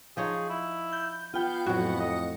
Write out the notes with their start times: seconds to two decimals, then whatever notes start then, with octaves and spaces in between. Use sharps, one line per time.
0.17 F3 D#4 G#4 C#5
0.50 E4
0.93 G6
1.34 B3 F4 G5
1.66 F2 A2 F#3 F#4
2.00 D#5